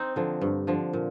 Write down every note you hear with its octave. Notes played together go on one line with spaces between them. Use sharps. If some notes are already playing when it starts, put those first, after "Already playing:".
Already playing: C4 D#4
D3 F3
G2
D3 F3
A#2